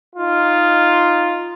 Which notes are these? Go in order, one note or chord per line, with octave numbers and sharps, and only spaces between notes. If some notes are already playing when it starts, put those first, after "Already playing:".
D#4 F4